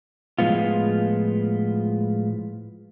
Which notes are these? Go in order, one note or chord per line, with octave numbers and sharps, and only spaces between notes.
A2 F3 G#3 B3 F4